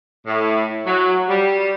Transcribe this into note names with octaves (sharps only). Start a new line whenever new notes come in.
A2
F#3
G3